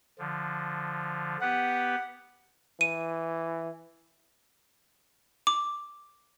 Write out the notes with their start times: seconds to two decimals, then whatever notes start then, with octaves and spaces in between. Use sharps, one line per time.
0.19 D3 F3
1.41 B3 G4 B4 F#5
2.81 E3 D#7
5.47 D6